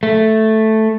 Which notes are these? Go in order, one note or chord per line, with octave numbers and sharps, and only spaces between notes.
A3